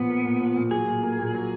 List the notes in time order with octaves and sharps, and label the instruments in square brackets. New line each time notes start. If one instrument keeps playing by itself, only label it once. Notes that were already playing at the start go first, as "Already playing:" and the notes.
Already playing: [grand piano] A#2 F3 [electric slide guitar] B3
[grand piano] A#3
A#2
F3
A#2
[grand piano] F#3 [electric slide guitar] G#4
[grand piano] A#2
A#3
A#2
F#3